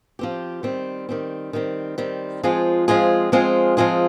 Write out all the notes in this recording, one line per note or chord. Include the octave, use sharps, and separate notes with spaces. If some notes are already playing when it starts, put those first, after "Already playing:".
F3 C4 G4
D#3 G3 C4
D#3 G3 C4
D#3 G3 C4
D#3 G3 C4
F3 G#3 C4 F4 G#4
F3 G#3 C4 F4 G#4
F3 G#3 C4 F4 G#4
F3 G#3 C4 F4 G#4